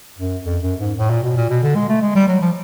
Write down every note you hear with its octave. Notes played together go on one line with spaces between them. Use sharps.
F#2
F2
F#2
G#2
A2
A#2
B2
A#2
B2
D3
G#3
A3
G#3
G3
F#3
F3